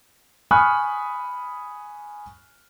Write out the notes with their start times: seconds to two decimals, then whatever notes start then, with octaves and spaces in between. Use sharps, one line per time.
0.51 G#5 B5 C#6 D#6 F6 F#6